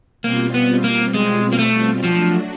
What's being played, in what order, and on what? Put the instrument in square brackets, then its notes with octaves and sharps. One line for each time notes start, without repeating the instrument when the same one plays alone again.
[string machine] B2 G3 C4 F4 [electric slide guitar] A#3
[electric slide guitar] B3
A#3
G#3
A#3
A3
[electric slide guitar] F3 [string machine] F#3 A3 D4 F#4